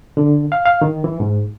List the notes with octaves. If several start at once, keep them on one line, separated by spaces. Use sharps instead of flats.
D3
F5
F5
D#3
E3
G#2